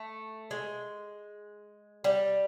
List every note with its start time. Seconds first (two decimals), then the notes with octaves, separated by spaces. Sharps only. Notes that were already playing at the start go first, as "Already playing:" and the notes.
Already playing: A3
0.51 G#3
2.04 G3